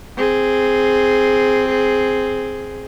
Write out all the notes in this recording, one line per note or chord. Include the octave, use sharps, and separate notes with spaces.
C4 G#4